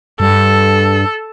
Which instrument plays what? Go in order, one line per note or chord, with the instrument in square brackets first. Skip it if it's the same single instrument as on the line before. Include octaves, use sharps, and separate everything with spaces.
[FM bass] G2 [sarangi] A4